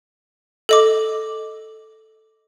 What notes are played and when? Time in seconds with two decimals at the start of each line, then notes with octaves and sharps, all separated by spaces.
0.69 A4 D#5 D6